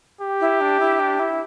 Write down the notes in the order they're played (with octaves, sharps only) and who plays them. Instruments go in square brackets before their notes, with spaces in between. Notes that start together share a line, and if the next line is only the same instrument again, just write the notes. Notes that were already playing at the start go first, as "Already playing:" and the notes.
[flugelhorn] G4
[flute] E4
D4
E4
D4
E4